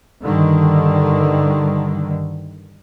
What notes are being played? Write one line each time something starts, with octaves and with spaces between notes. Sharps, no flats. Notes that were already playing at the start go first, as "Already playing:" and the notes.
G2 D3 D#3